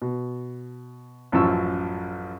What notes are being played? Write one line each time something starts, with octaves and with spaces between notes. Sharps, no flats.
B2
A1 F#2 F3 A5 C#6 E6